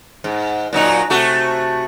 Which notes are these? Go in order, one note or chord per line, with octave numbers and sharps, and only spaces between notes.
G#2
A#2 F#3 D#4
C3 A3 F#4